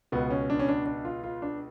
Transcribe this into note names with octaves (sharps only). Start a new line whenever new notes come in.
C#2 B2 B3
C#4
D4
C#4
D4
D4
F4
F4
D4